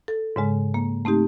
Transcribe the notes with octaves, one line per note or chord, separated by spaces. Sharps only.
A4
G#2 C#3 G#3
A#3
A3 C4 D#4 G4